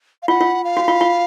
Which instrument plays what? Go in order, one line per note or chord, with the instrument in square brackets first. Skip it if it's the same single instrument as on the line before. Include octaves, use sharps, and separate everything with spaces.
[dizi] F5
[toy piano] F4 [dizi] F#5
[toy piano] F4
[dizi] F5
[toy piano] F#4
F4
F4